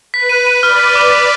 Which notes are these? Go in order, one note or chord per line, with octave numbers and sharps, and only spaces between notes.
B4 B6
D#7
D#7
D5 F6
B6
D6
B6